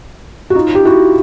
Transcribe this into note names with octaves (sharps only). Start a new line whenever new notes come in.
F#4
D#4 F4
G4
E4 F#4